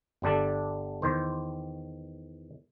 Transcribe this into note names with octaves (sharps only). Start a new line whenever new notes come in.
G1 G3 D4 A4
E2 D#3 C5